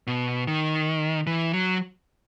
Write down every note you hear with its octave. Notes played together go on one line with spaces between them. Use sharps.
B2
D#3
E3
F#3